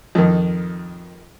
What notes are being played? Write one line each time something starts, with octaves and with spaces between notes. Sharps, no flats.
F2 D#3